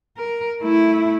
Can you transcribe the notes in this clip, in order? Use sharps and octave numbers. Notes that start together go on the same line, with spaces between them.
A#4
A3 E4